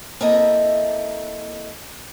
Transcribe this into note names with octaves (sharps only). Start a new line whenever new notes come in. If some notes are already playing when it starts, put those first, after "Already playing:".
A#3 C4 E4 A4 D#5 E5